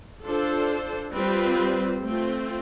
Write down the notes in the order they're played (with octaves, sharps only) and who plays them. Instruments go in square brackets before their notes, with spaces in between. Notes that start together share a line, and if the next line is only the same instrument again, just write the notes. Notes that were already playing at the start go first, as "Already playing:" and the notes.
[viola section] D4 F4 A4 C5
G3 C4 F4 B4
A3 C4 F4